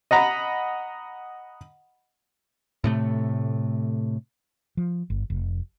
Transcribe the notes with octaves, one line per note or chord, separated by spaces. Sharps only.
D#5 F#5 A#5 B5
A2 C3 A3
F3
G1
F1